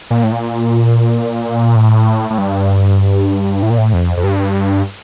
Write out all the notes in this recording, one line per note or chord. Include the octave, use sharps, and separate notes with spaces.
A#2
A2
A#2
A2
A2
G2
A2
A#2
A2
F2
F2
G2